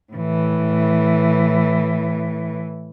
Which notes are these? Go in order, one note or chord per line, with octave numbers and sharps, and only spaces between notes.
A2 E3